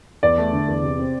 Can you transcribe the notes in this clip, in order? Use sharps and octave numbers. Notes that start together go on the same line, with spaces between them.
E2 D5
A3
D3
E2
C3
C4